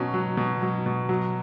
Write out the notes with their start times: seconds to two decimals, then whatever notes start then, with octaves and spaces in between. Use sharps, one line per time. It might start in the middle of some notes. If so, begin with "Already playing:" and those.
Already playing: B2 F#3 C#4
0.14 F#3
0.37 B2
0.62 F#3
0.86 B2
1.09 F#3